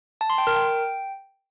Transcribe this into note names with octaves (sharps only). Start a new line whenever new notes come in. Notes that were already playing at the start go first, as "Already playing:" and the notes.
A5
C6
G5
A#4
G5